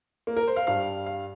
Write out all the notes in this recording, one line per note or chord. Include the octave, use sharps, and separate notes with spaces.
A#3
A#4
C5
F5
G2 G3 F5
F5